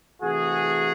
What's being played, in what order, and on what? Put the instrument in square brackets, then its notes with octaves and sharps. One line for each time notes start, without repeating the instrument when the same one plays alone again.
[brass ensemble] C3 E3 A3 F#4 G#4